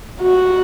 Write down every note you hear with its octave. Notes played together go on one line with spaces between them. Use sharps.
F#4